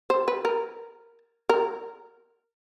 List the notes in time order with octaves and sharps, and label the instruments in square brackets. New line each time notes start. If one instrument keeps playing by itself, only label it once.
[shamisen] C5
B4
A#4
A#4